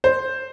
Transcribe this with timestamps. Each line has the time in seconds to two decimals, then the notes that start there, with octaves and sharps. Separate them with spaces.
0.04 C5